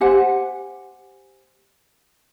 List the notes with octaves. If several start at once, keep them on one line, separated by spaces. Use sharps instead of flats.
G4 C5 F#5 G#5